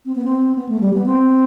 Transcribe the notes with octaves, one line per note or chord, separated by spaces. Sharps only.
C4
B3
C4
B3
A3
G3
B3
C4